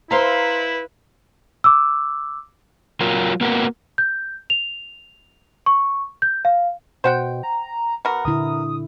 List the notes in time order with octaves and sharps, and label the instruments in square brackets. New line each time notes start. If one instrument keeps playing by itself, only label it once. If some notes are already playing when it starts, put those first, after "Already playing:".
[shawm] E4 [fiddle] B4 [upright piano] C5 A#5 [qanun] E5 F5 C6
[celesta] D6 E6
[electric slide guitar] F#3 F4 A#4
A#3 B3 F#4 A#4
[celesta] G6
F7
C#6
G6
F5
[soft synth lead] B2 [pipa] C5 F#5 G5
[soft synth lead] A#5
[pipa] B2 A#4 [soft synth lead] F#5
[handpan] A#2 D3 E4 [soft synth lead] D#6